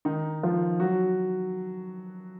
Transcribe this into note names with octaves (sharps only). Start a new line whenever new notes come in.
D#3 D#4
F3 F4
F#3 F#4